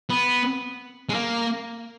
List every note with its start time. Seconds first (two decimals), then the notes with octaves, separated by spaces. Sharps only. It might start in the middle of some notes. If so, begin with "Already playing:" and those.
0.10 B3
1.09 G#3
1.14 A#3